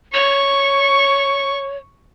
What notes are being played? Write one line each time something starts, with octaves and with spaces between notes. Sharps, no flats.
C#5 C#6